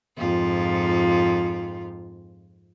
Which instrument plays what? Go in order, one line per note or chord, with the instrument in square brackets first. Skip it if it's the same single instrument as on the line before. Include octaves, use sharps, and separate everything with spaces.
[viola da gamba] F2 G#2 F4